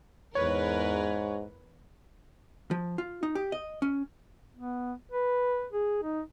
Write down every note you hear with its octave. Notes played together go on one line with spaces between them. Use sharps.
E2 G#2 A#4 B4 C#5
F3
F4
D#4
G4
D#5
C#4
B3
B4
G#4
D#4